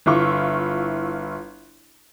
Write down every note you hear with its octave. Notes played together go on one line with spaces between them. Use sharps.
G1 E4 F4 C#6